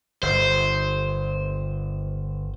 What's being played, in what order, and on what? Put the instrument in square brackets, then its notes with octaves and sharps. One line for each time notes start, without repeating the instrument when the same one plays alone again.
[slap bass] G1 [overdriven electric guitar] C5